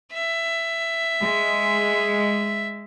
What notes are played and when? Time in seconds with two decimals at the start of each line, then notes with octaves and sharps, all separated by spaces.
0.13 E5
1.20 G#3